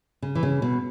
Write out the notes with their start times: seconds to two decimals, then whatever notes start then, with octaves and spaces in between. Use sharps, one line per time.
0.22 C#3
0.35 E3
0.43 C#3
0.62 B2